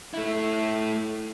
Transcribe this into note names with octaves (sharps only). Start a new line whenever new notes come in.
A3 E4